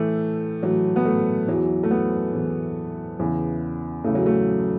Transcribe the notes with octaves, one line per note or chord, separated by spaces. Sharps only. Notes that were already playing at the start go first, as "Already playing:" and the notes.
Already playing: A2 E3 A3
A2 E3 F#3
B3
A3
E2 E3 F#3
A3
B3
E2 E3
E2 C#3 E3
E2 C#3 E3 A3
F#3
A3